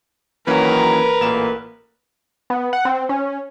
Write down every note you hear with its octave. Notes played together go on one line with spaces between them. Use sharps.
D#3 E3 F#3 A#3 C#4 A#4 B4
A1 A#2 A3 A#3 E7
B3
F#5
C4
C#4